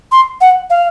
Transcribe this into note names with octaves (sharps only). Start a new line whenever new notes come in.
C6
F#5
F5